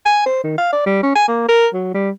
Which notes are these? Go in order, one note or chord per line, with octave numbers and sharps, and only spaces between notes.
G#5
C5
D#3
F5
D5
G3
C#4
G#5
A#3
A#4
F#3
G3